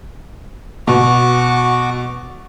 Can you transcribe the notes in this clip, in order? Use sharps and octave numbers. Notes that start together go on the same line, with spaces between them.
B2 F#4 C#6 D6